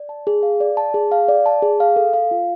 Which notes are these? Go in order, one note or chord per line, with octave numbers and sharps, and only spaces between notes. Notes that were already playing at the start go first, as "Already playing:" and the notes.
Already playing: D5
A5
G#4
F5
D5
A5
G#4
F5
D5
A5
G#4
F5
A4
F5
F4